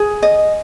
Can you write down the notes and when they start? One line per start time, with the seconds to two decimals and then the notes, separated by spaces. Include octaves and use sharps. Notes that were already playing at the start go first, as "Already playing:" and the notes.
Already playing: G#4
0.23 D#5